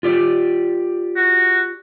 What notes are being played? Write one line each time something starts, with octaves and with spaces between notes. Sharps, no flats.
F4 G4 D5
F#4